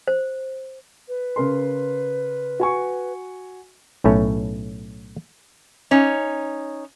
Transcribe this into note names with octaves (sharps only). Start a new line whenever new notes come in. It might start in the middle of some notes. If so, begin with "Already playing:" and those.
C5
B4
C#3 A#4 C6
F#4 G#5 C#6
B1 A2 A3 C#4 C#5
C#4 D#4